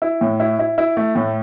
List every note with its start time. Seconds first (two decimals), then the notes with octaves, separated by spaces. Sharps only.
0.02 E4
0.21 A2
0.40 E4
0.59 E4
0.78 E4
0.97 A3
1.15 A2